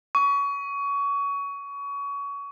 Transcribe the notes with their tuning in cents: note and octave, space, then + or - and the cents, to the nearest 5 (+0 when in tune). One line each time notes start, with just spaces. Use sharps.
C#6 +25